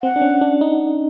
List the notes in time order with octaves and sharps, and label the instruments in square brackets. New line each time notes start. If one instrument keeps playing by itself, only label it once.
[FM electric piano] C4 [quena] F#5
[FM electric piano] D4
C#4
D4
D#4